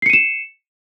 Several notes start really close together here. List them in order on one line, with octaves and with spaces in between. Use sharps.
C7 C#7 D#7 E7